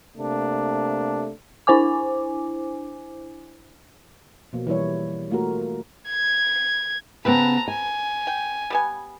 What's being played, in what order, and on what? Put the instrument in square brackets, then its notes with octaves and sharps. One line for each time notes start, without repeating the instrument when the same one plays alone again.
[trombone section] C3 A3 A#3 D4
[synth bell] D4 E4 C5 G#5 D6
[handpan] B2 F3 A#3
E3 G3 E4 C#5
A3 A#3 F4 F#4 A#4
[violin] G#6
[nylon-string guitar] C#3 B3 [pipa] G3 C4 B4 [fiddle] A5 A#5
[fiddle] G#5 [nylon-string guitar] A5
[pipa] G5
G3 B3 G#5